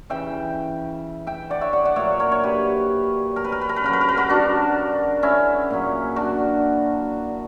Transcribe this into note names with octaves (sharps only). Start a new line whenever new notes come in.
C#3 E3 E5 G5
E5 G5
D5 F#5
C#5 E5
D5 F#5
D5 F#5
A#2 F#3 C#5 E5
A#4 C#5
C#5
G4 B4
A#4
B4
A#4
B4
A#4
B4
C#3 F#3 A#4
B4
A#4
B4
F#4 A#4
D4 F#4
C#4 E4
A#2 F#3
D4 F#4